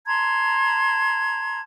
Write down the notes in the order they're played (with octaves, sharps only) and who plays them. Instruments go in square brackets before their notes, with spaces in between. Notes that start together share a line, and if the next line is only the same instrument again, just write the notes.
[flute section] A5 A#5 C6 G#6